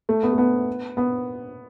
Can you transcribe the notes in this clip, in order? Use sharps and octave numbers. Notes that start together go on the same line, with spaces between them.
A3
B3
A3
B3
B3